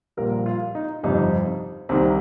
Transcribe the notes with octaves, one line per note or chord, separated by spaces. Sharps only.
A#1 A#2 G3 A#4
F4
D#4
G1 F2 C3 G3 D#4
C2 C3 D#3 G3 C4